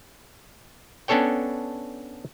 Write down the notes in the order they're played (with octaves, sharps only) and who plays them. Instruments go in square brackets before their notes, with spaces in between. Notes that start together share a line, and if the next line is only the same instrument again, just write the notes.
[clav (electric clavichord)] B3 C#4 D4 A4 C#5 G5